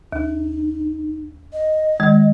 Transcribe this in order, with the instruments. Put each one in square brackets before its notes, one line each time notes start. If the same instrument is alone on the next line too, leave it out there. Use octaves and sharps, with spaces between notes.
[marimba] D#2 [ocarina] D#4
[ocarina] D#5
[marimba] D#3 G#3